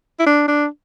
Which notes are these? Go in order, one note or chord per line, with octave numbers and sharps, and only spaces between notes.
E4
D4
D4